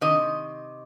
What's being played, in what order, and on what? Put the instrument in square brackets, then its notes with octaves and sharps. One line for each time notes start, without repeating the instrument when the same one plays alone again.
[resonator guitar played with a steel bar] C3 D#3 D#5